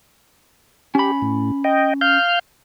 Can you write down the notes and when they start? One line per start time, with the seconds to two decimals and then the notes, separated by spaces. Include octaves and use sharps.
0.95 C#4 G4 B5
1.22 A2
1.64 D#5 G5
2.01 F5 F6 G6